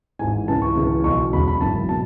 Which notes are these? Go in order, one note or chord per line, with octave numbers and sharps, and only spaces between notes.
G#1 G#2 E3 G#5
C#2 C#3 E3 A5
C#6
C#2 C#3 E3
B1 B2 C#6
E1 D2 C#3 B5
B5
G#1 F#2 E3 A5
B2 A5